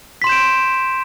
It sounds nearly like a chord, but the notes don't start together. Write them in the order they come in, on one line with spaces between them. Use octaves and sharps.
B6 C6 E7 G6 D7